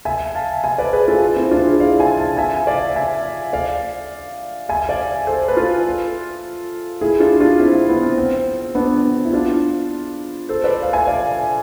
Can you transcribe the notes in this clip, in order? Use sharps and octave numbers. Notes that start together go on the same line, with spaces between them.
E5 G#5
F5 A5
E5 G#5
B4 D5
G#4 B4
F4 A4
C4 E4
D4 F4
E4 G#4
D5 F5
E5 G#5
F5 A5
E5 G#5
G#5
D5 F5
E5 G#5
D5 F5
E5 G#5
D5 F5
A4 C5
B4
F4 A4
E4 G#4
D4 F4
D4 F4
C4 E4
C4 E4
B3
C4
C4
B3 D4
E4
D4 F4
A4 C5
B4 D5
F5
E5 G#5
D5 F5